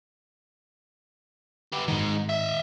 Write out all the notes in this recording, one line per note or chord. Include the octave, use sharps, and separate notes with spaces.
B3 G4
G#2 D#3 G#3 D#4
D#5 E5